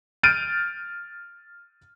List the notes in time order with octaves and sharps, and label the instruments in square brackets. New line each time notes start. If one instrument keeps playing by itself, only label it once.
[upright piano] F6 G6 A6 D7 D#7